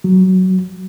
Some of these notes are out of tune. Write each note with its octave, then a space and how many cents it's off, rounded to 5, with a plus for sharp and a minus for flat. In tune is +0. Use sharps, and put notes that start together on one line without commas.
F#3 +15